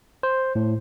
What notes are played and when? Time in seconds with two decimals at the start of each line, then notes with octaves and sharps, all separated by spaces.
0.23 C5
0.55 A2